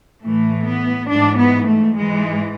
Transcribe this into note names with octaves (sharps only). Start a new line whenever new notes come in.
A2 E3 A3
B3
G#2 E3 D4
B3
A3
G#2 E3 G#3